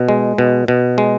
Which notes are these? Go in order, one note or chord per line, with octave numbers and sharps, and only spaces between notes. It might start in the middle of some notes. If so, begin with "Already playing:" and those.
Already playing: B2
G#3
B2
B2
G#3